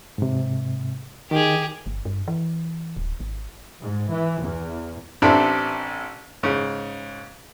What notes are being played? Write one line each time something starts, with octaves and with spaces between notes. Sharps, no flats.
G#2 C3
D#3 G4 G#4
G1
G2
E3
D1
G#1
G#2
E3
E2
A1 C4 D4 A4 E5
G#2 C#3